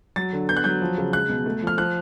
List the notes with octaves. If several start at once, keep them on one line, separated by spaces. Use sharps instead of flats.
F#3 A6
D3
B3 G6
F#6
F#3 G6
F3
C#3
G#3 F#6
B2
A3
F3 F6
F3 F#6